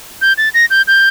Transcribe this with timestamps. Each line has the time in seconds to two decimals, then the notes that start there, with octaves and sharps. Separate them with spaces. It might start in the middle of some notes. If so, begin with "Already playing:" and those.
0.22 G6
0.38 A6
0.54 A#6
0.70 G6
0.88 G6